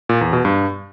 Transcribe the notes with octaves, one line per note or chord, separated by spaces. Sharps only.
A#2
E2
B2
G2